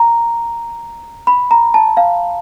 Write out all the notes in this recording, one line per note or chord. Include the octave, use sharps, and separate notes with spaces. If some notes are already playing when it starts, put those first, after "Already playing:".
Already playing: A#5
B5
A#5
A5
F5